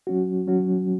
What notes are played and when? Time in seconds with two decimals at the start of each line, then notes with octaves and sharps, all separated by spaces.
0.07 F#3 C#4 F#4
0.47 F#3 C#4 F#4